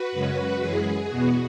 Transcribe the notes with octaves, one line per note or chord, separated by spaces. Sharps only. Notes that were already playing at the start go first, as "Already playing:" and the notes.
Already playing: F#4 B4
F#2 C#3 G#3 C#4
F#2 E3 G#3 G#4
E2 B2 B3 F#4